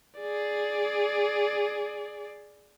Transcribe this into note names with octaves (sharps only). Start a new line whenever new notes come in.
G#4 D5